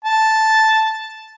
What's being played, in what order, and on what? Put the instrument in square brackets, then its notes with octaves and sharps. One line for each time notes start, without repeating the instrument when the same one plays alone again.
[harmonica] A5